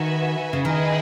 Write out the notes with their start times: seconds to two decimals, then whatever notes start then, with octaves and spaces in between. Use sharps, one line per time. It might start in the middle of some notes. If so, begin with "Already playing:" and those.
Already playing: D#3 F#4 B4 E5 G#5
0.53 C#3
0.64 D#3 E4 G#4 B4 D#5